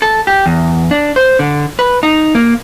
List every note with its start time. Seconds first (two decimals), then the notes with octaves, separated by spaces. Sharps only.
0.02 A4
0.27 G4
0.46 E2
0.91 D4
1.16 C5
1.39 D3
1.79 B4
2.03 D#4
2.35 A#3